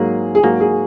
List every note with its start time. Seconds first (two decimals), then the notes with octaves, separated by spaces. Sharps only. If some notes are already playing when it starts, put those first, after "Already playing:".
Already playing: G#2 F#3 A#3 G#4
0.35 G#4
0.43 G#2 F#3 A#3 F#4
0.60 G#4